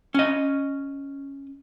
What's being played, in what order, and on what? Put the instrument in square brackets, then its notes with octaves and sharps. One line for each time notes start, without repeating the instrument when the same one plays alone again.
[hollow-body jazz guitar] C#4 D#5